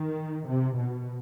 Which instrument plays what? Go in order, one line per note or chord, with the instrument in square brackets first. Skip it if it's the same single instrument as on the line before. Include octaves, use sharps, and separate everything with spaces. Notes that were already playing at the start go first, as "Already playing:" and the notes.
Already playing: [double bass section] D#3
C3
B2